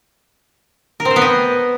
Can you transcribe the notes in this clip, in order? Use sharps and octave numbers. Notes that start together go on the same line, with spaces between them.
A#4
C4
C5
B3
D#5